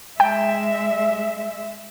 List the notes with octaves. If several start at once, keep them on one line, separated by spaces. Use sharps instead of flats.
G#3 E5 G5